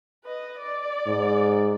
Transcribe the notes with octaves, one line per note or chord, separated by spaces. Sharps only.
B4 D#5
D5
G#2